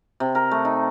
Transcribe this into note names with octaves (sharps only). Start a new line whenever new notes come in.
C3
A#4
A3
D#4